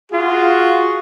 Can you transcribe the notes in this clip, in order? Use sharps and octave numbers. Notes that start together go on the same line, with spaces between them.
F4 F#4 G#4